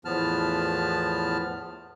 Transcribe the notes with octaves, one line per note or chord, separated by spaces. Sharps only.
E2 A2 F3 B3 A5 F6